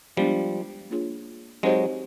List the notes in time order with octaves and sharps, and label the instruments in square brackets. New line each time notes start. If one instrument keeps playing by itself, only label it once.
[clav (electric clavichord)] F3 G3 [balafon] G#3 B3 D4
[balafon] A#3 D4 F4 G#4 C#5
[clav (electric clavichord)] F#3 G#3 [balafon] C4 D#4 G4 C5 D#5